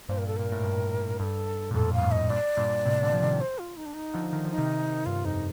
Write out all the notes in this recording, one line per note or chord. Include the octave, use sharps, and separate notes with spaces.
G2 A#2 C5
A#4
A4
A#2 A#4
A2
G2
G2 A4 A#4
A#2
F2 A2 A4
G2 F5
F2 A2
D#5
G2 A#2 D5
G2 A#2
A2 C3
A#2 D3
F3
C3 D#3
C5
F4
D#4
D4
D#4
D3 F3
D#3
F3
D#4
C3 D#3
G2 F4
F2 D#4